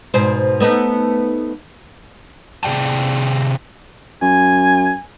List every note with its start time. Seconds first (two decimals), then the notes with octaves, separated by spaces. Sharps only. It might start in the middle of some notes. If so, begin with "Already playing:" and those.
0.14 G#2 B2 C5
0.60 A3 B3 D#4
2.63 C3 G#4 D5 G5 A5
4.22 F#2 G#5